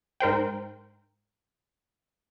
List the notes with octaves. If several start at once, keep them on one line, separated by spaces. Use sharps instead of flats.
G#2 A#4 C5 G5